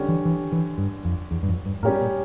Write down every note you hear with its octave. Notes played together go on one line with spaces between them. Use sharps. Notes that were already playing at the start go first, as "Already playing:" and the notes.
Already playing: D3 G3 C#4 G4 C#5
E3
E3
E3
G2
F2
E2
G2
F2
G2
A2 G3 C#4 G4 A#4
A#2